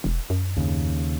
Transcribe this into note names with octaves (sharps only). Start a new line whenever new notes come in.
E1
F#2
D#2 C#3